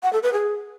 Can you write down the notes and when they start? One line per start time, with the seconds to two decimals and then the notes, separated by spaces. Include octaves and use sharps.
0.03 F#5
0.13 A4
0.23 B4
0.33 G#4